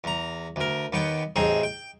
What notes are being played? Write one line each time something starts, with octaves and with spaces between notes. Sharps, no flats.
E2 A#5
D2 A#4
D#2 B3 G5
A1 C4 D#4 G#4
G5